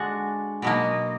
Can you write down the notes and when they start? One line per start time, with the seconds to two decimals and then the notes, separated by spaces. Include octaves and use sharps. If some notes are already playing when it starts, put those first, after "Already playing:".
Already playing: D3 G#3 D4 F#4
0.62 B2 F#3 A#3 D#5